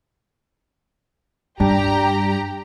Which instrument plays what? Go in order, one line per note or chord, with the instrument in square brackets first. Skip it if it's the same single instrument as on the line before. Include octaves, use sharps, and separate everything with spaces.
[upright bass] G2 [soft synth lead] G3 [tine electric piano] D4 [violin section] G4 A#5